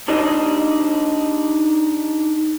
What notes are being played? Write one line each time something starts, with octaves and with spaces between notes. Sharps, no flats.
D4 D#4 G4 D5 D#5